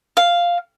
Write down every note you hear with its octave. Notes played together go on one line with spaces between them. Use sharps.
F5